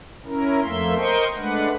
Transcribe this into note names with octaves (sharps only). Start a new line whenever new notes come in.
C#4 E4 A#4
F2 A3 A#3 E5 C6
A#4 C5 D#5 G5 C6 C#6
G#3 A3 D4 B4 F#5